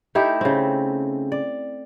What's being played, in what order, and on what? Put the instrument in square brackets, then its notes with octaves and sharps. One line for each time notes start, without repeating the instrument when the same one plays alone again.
[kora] A3 D#4 E4 G4
C#3 C4
D5